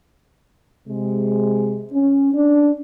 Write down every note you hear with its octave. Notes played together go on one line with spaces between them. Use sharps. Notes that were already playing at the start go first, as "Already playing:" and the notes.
C3 G#3
C#4
D4